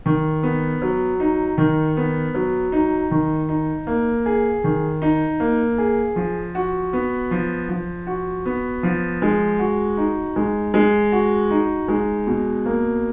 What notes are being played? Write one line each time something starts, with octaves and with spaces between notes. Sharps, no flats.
D#3
B3
F#3
D#4
D#3
B3
F#3
D#4
D#3
D#4
A#3
G#4
D#3
D#4
A#3
G#4
F3
F#4
B3
F3
F3
F#4
B3
F3
G#3
F#4
D#4
G#3
G#3
F#4
D#4
G#3
B2
A#3